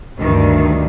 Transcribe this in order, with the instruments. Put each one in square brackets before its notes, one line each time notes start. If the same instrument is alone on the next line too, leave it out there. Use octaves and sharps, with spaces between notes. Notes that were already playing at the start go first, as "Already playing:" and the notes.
[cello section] D2 G2 D#3